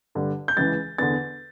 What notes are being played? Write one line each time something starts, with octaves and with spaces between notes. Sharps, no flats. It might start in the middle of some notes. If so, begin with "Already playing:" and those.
G2 D3
G6
C#2 C#3 E3 A6
E2 D3 A6